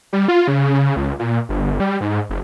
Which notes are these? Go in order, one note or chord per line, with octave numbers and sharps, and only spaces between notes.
G3
F4
C#3
C#2
A#2
G1
G3
G#2
F#1